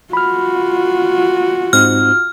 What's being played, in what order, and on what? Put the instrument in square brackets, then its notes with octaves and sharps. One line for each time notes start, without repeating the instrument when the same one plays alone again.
[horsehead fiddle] F4 F#4 [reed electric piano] B5 F6
[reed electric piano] G#2 C4 D#4 [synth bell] F6